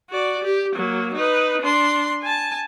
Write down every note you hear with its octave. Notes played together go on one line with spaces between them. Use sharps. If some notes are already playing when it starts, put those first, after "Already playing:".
F#4 D5
G4
F#3 A#3
D#4 B4
D4 C6
G#5 A5